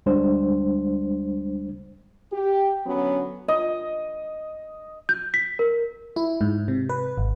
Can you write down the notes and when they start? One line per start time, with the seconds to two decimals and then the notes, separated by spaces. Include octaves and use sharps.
0.06 D2 G3 G#3 D4 C5
2.32 G4
2.86 D3 F#3 B3 C#4
3.48 D#5
5.09 G6
5.34 B6
5.59 A#4
6.16 E4
6.41 G#2
6.68 C3
6.89 B4
7.17 G#1